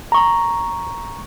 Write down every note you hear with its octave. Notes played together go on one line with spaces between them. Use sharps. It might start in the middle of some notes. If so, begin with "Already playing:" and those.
A#5 C#6